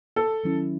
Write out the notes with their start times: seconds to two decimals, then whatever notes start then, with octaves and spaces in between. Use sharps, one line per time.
0.16 A4
0.44 D#3 F#3 C#4 E4